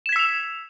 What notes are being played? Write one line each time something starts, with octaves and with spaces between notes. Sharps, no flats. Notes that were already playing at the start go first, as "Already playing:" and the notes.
E6 G#6 B6 E7 F7